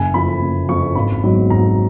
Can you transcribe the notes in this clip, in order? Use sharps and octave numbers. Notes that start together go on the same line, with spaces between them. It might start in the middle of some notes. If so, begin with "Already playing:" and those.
Already playing: F#1 G#5
F2 F3 B5
F#1
F2 F3 C#6
G#1 B5
G#2 F#3 B3 D#4
G#1 A#5